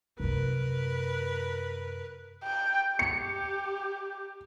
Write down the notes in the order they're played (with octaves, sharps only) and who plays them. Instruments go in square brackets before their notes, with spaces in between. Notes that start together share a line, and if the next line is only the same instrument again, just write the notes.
[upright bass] F#2 C3 [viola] A#4 B4
[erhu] G5
[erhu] G4 [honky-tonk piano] C#7